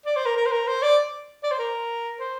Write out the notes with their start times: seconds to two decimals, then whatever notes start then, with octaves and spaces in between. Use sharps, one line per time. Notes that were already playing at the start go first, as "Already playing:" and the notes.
0.06 D5
0.16 C5
0.26 A#4
0.37 A#4
0.46 C5
0.52 A#4
0.67 C5
0.83 D5
1.43 D5
1.51 C5
1.59 A#4
2.20 C5